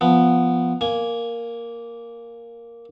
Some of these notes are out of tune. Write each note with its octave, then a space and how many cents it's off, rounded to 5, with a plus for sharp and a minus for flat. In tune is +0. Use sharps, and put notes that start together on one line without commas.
F3 +0 B3 +0
A#3 +0 G#5 +0